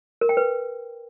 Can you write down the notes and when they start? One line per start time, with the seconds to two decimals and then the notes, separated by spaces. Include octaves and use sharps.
0.21 A#4
0.29 G5
0.37 B4